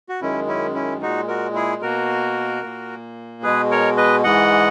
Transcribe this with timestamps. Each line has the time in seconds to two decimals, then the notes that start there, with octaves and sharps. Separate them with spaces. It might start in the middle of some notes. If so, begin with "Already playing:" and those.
0.09 F#4
0.21 F#2 D#3 G#3 C#4 E4
0.47 C#4 E4
0.74 C#4 E4
1.01 A#2 G#3 D#4 F#4
1.28 F#4 A#4
1.55 E4 G#4
1.82 B2 A#3 F#4 A#4
2.63 A#2 A#3
3.43 B2 G#3 G#4 B4
3.71 A#4 C#5
3.97 B4 D#5
4.24 G#2 E3 G#3 D#5 F#5